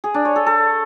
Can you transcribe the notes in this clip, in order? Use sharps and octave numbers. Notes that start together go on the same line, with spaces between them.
G#4
D4
C#5
A4
A4